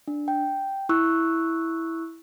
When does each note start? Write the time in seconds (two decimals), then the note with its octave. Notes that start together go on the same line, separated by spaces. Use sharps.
0.08 D4
0.28 G5
0.89 E4 C#6 E6 F#6